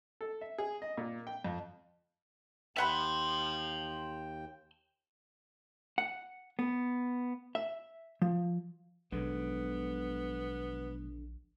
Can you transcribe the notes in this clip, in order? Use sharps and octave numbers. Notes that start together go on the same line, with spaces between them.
A4
E5
G#4
D#5
A#2
G5
F2
D#2 E5 F#5 G5 A5 B5 C6
F#5
B3
E5
F3
A#1 B2 D3 F#3 G#3 B3